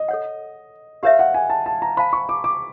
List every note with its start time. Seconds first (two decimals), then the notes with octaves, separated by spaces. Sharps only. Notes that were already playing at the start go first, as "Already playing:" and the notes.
Already playing: D#5
0.08 A4 C#5 F#5
1.03 G4 A#4 C#5 E5 F5
1.19 F#5
1.34 G#5
1.50 A5
1.66 A5
1.82 A#5
1.97 C5 F5 A5 B5
2.13 C#6
2.29 D6
2.44 D6